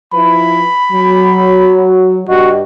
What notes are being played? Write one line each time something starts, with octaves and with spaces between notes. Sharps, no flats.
F3 E4 B4 B5
F#3
G2 F#4 G4 D#5